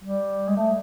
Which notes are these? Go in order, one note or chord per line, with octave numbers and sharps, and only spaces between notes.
G3
G#3
A3